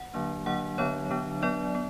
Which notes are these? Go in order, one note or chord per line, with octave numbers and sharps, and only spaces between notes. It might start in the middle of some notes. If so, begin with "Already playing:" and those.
Already playing: F#5
D3 F#3 A#3 D4
D3 F#3 A#3 D4 F#5
D3 F#3 B3 D4 C#5
D3 F#3 B3 D4
F#3 B3 D4 D5
B3